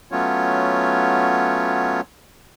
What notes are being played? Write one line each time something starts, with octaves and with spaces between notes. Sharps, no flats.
F#3 A3 B3 C#4 F4 C#5